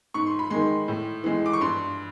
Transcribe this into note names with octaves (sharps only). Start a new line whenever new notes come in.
G#2 C#6
C6
B5
D#3 G#3 C6
A2
E3 G#3
D6
C#6
G2 C6